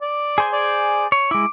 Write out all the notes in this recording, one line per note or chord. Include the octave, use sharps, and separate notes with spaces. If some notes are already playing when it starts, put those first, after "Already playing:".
D5
G#4 C5 G#5
D5
C#5
G#3 E4 D6